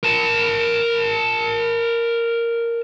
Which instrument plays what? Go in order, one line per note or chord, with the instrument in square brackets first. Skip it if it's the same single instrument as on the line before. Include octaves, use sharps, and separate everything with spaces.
[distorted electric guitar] A#4 A5